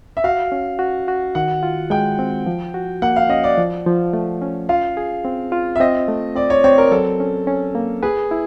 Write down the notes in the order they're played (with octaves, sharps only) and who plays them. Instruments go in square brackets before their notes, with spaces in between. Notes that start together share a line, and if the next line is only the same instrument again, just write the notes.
[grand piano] E5
[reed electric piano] F#4 [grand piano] F5
[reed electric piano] C#4
F#4
F#4
[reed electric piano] D#3 [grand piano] F#5
[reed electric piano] F4
[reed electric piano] G#3 [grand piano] G5
[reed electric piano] C4
F3
F#4
[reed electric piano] A#3 [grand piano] F#5
[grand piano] F5
[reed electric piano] C#4 [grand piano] D#5
[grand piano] D5
[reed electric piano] F3
F3
A3
C#4
[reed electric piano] F4 [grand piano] F5
[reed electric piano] G#4
C4
F4
[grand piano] E5
[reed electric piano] C4 [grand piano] D#5
[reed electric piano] A3
[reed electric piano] C4 [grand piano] D5
[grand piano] C#5
[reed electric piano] C4 [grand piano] C#5
[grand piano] A#4
[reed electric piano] F#3 [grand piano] A4
[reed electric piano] C#4
C#4
A#3
[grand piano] G#4 [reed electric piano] B4
[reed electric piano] E4